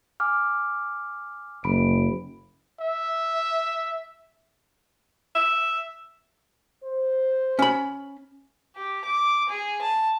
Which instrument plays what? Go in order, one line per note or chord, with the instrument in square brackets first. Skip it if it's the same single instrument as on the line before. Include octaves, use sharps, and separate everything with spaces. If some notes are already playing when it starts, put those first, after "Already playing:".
[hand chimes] G#5 D6 F6
[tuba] F#1 [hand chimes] B5 D7
[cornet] E5
[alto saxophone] E5
[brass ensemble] C5
[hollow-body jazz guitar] C#4 B5
[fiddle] G4
D6
G#4
A5